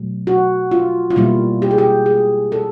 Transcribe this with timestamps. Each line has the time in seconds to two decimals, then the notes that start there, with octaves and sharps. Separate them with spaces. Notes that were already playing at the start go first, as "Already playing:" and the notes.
Already playing: B2 F#3 A3
0.27 F#4
0.71 F4
1.10 F4
1.16 B2 G3 A#3 E4
1.62 G4
1.71 G#4
1.78 G4
2.06 G#4
2.52 A4